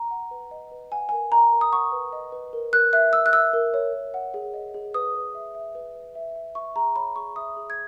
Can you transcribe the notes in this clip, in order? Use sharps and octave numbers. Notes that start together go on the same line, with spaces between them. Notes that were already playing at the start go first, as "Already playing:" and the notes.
Already playing: A#5
F#5
B4
D#5
B4
F#5 G#5
A#4 G#5
D#5 A#5
A#4
D#6
F#5 C#6
B4
D#5
B4
A#4
A#4 F#6
E5 F#6
E5 E6
F#6
E5 E6
A#4
C#5
A#4
F#5
G#4
D#5
G#4
B4 D#6
B4
E5
E5
B4
B4
E5
E5
E5 C#6
G#4 A#5
C#5 B5
G#4 C#6
E5 D#6
G#4
G#6